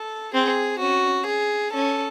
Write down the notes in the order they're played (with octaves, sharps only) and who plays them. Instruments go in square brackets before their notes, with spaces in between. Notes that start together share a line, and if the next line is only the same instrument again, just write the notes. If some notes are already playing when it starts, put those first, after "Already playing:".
Already playing: [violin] A4
[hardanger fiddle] C4 [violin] G#4
[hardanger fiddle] C#4 [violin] F#4
[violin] G#4
[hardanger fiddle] C#4 [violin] A4